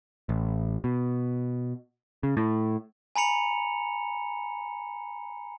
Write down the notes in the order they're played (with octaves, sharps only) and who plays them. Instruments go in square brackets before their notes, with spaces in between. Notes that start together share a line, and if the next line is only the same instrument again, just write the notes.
[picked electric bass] A1
B2
C#3
A2
[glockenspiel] G#5 A#5 B5 C#7 F7